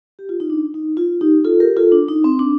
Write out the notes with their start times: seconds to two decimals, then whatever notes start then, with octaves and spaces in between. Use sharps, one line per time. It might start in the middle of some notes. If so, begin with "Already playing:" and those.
0.19 G4
0.29 F4
0.40 D#4
0.50 D4
0.74 D#4
0.97 F4
1.21 D#4 G4
1.44 F4 A4
1.60 G4 A#4
1.77 F4 A4
1.92 D4
2.08 D#4
2.24 C4
2.39 D4